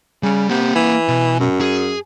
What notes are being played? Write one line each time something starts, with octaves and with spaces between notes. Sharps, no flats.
C#3 G3
C3 A#3 F#5
E3
B2
F#2
G#4